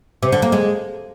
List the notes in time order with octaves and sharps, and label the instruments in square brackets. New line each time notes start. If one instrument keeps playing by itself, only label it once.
[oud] C3
D3
A#3
G#3